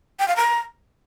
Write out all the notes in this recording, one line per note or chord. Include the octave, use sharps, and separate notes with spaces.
G5
F5
A#5